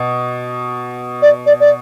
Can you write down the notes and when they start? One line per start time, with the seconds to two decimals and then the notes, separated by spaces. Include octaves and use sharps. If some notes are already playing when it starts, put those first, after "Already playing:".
Already playing: B2
1.22 D5
1.46 D5
1.60 D5